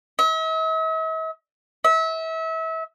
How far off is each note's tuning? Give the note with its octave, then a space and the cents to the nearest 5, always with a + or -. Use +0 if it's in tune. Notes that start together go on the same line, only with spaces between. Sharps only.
E5 -45
E5 -30